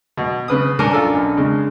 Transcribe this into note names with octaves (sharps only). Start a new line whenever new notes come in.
B2
C#3 B4 D#6
C#4 D4 A#4
F4 A4 G#5
B1
C#3 G#3